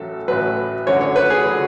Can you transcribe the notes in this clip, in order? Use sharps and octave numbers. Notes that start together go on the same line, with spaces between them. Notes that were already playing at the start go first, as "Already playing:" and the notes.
Already playing: A1 A2 F#3 A4
A1 A2 F#3 B4
F#2 D3 F#3 C#5
C#5
B4
G#4
D3 F#3